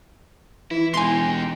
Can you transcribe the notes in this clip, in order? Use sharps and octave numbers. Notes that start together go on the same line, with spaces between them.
E3 E4
E1 D#4 G4 G#5 C6